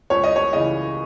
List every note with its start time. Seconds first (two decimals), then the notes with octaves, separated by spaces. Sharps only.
0.10 C#2 C#5
0.24 D#5
0.36 C#5
0.53 C#3 E3 D#5